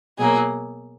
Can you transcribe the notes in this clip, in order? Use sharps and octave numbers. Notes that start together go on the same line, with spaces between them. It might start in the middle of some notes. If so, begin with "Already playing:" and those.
B2 F#3 A#3 G#4